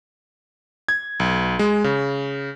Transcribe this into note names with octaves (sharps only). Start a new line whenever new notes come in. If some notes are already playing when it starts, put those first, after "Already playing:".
G#6
B1
G#3
C#3